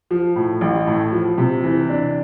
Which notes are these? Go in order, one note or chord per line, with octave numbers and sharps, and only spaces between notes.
F3
A2
A1
A2
F3
C3
E3
D4